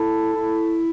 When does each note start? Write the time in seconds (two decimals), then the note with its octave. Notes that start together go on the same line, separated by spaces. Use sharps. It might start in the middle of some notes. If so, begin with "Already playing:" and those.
Already playing: E4 A4
0.34 E4